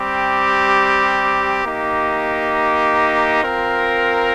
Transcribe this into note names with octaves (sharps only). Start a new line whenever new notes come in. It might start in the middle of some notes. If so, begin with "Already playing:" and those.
Already playing: G3 C4 G4
A#3 D#4 G4
C4 F4 A#4